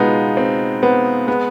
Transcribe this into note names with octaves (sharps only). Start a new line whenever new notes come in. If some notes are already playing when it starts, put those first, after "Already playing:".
Already playing: B2 G#3 B3 D#4 F4
C4
B3 C4
G#3 B3